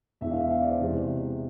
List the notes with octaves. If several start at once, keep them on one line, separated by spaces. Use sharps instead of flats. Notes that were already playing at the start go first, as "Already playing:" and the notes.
E1 E2 B2 E5
F5
E5
F5
D5
C5
E2 C3 G#3